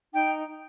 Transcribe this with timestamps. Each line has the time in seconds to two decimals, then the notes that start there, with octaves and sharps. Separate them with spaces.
0.13 D#4 G5